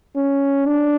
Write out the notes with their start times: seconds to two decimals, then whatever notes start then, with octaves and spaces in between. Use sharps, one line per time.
0.16 C#4
0.66 D4